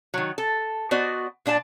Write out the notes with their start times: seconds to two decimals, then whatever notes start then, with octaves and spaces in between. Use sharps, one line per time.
0.14 D#3 F#3
0.38 A4
0.91 B3 F#4 C5 D5 D#5
1.46 A#2 D4 D5 A5